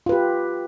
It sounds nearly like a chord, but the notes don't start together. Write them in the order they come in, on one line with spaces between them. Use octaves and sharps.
F4 B4 G4